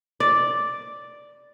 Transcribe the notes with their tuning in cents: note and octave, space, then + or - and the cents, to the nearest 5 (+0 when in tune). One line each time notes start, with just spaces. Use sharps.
D5 +0